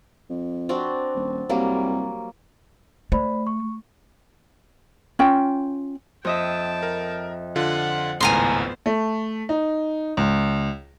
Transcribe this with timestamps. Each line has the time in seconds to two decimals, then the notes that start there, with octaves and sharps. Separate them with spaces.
0.29 F2
0.69 C4 D4 F#4
1.15 D#1
1.49 C2 F#3 G3 A#3
3.12 A3 C5 D5 B5
3.47 C#6
5.19 C#4 F4 G5
6.25 F2 D#5 E5 G5 A5
6.83 A#4
7.56 D3 F4 F#5
8.20 G#1 C#2 A2 B3 C5 G#5 A#5 C6
8.86 A3
9.49 D#4
10.17 C#2